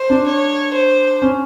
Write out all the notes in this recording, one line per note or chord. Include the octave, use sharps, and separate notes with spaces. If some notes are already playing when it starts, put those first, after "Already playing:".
Already playing: C5
D4
C#5
C5
C#4